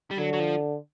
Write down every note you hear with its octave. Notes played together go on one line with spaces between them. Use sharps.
G3
D3 F#3
F#3
F3